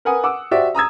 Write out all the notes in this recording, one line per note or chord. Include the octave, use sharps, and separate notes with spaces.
A#4 B4 F#5 G#5 D#6
F#5 D6 E6
F#4 G4 C5 D5 E5
A#5 D#6 E6 G#6